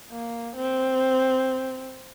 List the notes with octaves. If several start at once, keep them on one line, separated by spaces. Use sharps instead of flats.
A#3
C4